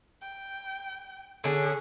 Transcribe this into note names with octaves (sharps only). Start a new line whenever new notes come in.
G5
D3 C#4 G#4